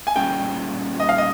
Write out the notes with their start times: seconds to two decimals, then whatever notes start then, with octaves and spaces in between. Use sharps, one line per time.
0.07 G#5
0.16 A#2 G3 C#4 G#4 G5
1.00 D#5
1.09 F5
1.18 D#5